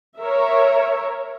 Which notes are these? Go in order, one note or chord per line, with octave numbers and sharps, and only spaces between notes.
A#4 C#5 E5